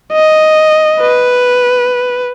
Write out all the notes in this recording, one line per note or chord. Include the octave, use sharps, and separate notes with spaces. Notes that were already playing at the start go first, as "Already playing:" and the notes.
D#5
B4